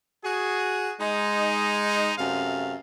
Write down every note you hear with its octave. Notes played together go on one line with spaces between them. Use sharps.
F#4 G#4
G#3 D#4
F#2 C3 A3 F5